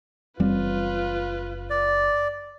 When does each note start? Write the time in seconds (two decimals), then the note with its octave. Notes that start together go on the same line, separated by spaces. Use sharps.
0.40 F#1 E3 G3 C4 F4 B4
1.70 D5